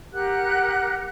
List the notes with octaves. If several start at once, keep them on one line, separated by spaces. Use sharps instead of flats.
G4 A#4 F#5 F#6